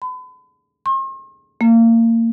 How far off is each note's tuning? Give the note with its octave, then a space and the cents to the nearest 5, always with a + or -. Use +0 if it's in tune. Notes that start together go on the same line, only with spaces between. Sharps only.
B5 +40
C6 +45
A#3 -30